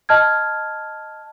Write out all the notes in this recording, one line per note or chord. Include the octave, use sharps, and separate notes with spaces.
D#5 A5 F6 G#6